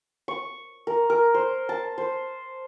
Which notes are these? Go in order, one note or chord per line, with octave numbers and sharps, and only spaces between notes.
C#6
A#4
A#4
C5
A5
C5